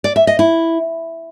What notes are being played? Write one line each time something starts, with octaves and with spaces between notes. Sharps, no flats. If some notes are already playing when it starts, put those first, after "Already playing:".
D5
E5
D#5
E4